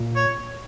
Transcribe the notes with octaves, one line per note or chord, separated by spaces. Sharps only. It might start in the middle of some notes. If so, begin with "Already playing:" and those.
Already playing: A#2
C#5